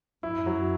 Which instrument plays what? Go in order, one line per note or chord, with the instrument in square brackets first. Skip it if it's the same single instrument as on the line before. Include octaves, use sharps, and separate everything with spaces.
[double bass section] F#2 [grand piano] E4
[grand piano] F#3